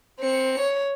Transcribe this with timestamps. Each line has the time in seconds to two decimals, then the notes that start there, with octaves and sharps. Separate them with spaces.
0.20 C4 C#7
0.60 C#5